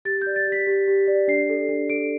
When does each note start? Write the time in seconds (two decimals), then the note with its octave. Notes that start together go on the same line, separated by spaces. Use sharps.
0.05 G4 A6
0.22 G6
0.26 D5
0.36 A6
0.47 G4 B6
0.67 G4
0.88 G4
1.08 D5
1.28 D4 C7
1.49 A4
1.69 D4
1.89 A4 D7